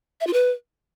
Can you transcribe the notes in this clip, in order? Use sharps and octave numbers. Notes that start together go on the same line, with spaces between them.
E5
F4
B4